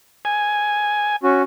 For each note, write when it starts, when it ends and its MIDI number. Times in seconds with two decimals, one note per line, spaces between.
0.25 1.16 80
1.23 1.42 61
1.23 1.42 66